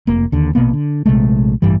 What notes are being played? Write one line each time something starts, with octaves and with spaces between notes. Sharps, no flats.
F1 A#3
D#2 D3
A#1 B2 A#3 B3
D3
A#1 C3 G#3 A3
A1 G2 E3 G3